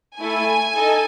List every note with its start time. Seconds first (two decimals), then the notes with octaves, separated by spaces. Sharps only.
0.19 A3 E4 A4 G#5
0.75 D#4 A4